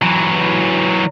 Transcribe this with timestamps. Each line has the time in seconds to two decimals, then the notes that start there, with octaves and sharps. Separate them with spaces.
0.02 E3 F#3